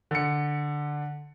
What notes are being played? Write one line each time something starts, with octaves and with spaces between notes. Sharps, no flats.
D3 C#7